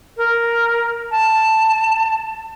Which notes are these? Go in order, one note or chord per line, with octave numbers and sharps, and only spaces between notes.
A#4
A5